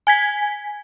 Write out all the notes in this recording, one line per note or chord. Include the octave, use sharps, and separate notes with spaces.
G#5 G#6 B6